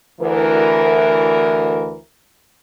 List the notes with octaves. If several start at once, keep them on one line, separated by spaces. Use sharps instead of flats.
D2 E3 A#4